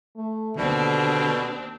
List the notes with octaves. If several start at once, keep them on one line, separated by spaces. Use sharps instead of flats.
A3
D#2 B2 D3 C4 D4